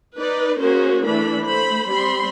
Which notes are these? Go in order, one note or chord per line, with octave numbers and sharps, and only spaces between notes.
D#4 B4 D5
A#3 C#4 F#4 G#4 A#4 C5
E3 A3 D4 B5
A3 C5 B5
G3 C4 B5 C6